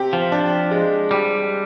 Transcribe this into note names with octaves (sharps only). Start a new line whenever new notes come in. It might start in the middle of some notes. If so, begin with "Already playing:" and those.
Already playing: C3 C4 G4
F3
D4
G#3
G3 G4